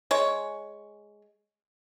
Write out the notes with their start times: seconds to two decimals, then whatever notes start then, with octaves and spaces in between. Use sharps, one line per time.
0.11 G#3 C#5